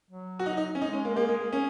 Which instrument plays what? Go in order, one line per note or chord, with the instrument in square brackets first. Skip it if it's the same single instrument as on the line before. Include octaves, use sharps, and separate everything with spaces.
[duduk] F#3
[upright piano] F#4
D#4
D#4
C#4
[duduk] G#3 [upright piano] D#4
[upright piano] C#4
A#3
[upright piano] A#3 [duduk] G#4
[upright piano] G#3
A#3
C#4